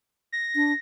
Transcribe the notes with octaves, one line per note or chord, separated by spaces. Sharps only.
A#6
D4